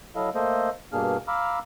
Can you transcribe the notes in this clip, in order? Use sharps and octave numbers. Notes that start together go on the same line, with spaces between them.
F#3 E4 A4 D#5 F5
A3 A#3 A4 C5 D#5
G2 B2 A#3 D4 G#4 F6
F5 A#5 B5 D6 E6 F6